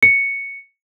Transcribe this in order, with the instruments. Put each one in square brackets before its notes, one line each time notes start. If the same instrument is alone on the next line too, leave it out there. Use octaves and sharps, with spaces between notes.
[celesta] C#7